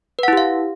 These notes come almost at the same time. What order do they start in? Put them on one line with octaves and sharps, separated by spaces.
B4 F#5 E4 G4 F5